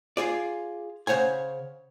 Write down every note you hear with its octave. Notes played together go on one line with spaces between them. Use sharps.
F4 G#4 D5
C#3 C5 C#5 F#5 G#5